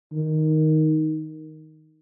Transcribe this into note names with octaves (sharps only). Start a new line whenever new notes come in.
D#3